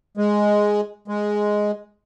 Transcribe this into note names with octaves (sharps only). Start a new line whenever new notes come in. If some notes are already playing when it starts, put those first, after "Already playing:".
G#3
G#3